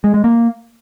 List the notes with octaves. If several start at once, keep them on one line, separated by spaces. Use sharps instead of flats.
G#3
G#3
A#3